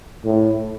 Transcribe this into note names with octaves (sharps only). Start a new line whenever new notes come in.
A2